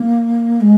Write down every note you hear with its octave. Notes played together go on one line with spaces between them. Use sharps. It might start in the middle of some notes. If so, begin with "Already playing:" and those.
Already playing: A#3
G#3